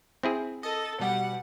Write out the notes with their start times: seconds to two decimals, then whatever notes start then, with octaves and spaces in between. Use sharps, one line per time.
0.23 C4 E4 G#4
0.63 A4 D#5
0.99 B2 G3 F#5